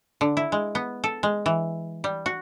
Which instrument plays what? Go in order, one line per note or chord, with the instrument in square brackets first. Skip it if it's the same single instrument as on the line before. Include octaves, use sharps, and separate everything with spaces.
[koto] D3
E4
G#3
B3
A4
G#3
E3
G3
F#4